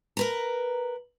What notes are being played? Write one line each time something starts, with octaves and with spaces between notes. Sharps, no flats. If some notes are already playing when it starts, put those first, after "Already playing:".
A#4 B4 A#5